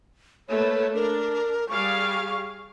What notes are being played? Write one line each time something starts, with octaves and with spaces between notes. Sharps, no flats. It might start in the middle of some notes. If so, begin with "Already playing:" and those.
A3 A#3 B4 C#5
D4 A#4
G3 G#4 F5 C#6